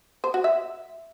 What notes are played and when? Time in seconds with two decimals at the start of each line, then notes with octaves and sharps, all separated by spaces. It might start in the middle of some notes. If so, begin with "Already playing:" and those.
0.24 C5
0.34 F#4
0.44 E5